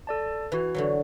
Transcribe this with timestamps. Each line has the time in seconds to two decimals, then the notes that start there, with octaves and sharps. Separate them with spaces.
0.07 A4 D5 A5
0.52 E3 F#4 B4
0.74 D3 E3 F#3